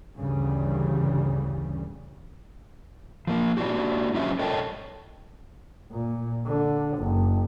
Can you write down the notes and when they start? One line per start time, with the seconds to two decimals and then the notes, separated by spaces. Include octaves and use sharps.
0.17 D2 G2 C#3 E3 G3
3.27 F3 A#3 F4
3.57 A#3 D4 E4 F#4 G4
4.14 D3 F#3 C#4 F4 G4 E5
4.39 A4 A#4 C#5 D#5 G5 A5
5.91 A#2
6.46 D3
6.98 F#1